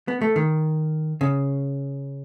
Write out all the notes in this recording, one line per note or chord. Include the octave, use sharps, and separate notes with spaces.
B3
A3
D#3
C#3